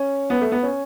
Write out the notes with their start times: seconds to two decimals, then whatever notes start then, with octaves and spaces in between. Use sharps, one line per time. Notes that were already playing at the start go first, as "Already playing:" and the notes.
Already playing: C#4
0.30 B3
0.41 A3
0.52 B3
0.63 C#4